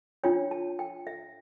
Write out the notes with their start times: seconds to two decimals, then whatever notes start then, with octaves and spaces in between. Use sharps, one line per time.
0.24 D4 F4 C#5 G5
0.51 A5
0.79 G5
1.07 E5